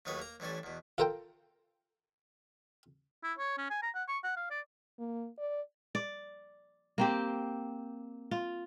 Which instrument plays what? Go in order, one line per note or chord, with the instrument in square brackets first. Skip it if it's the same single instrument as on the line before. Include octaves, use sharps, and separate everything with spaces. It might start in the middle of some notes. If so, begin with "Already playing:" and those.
[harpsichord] D#2 A2 F#3 D#4 B4 C#5
A#3 A#5
A1 E3 G3 C#4 A4
E2 B2
F4 A4 A#4 C5 G5
[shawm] E4
C#5
C#4
G#5
A#5
F#5
C#6
F#5
F5
D5
[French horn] A#3
D5
[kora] D5
A#3 C4 G4
F4